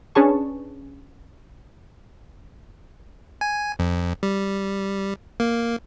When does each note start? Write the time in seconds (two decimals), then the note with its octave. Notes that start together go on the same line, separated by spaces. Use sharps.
0.15 C#4 D4 G#4 B4 A5 C#6
3.41 G#5
3.79 F2
4.23 G3
5.40 A#3